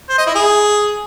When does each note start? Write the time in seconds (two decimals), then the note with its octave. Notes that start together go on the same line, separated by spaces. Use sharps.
0.09 C5
0.18 D#5
0.27 E4
0.35 G#4